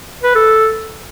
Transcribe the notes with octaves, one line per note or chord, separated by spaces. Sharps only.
B4
A4